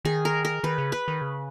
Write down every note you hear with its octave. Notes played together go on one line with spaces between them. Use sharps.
D#3 G#4
A#4
A#4
D#3 B4
C#3
B4
D#3
C#3